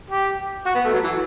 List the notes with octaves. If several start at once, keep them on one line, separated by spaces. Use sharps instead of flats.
G4
F#4
B3
A3
F#3
E3